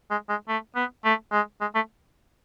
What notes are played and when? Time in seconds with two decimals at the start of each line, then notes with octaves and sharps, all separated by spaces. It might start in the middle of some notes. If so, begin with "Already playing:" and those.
0.11 G#3
0.29 G#3
0.48 A3
0.75 B3
1.05 A3
1.32 G#3
1.61 G#3
1.75 A3